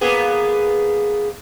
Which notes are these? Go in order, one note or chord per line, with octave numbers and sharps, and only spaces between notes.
A#3 B3 G#4